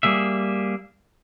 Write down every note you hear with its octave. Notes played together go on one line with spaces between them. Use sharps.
G3 A#3 G#4 E5